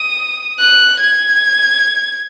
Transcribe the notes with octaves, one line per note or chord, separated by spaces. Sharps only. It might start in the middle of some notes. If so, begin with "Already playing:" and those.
Already playing: D#6
F#6
G#6